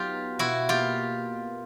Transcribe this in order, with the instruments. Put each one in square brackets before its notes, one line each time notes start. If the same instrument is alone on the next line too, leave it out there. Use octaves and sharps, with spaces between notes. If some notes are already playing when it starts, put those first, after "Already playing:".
Already playing: [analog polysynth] F#3 B3 D#4 [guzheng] F4 G4
[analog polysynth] B3
[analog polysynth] B2 [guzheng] E4 F#4
[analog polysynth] A#3 [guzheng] F4 G4
[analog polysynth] A#3
B2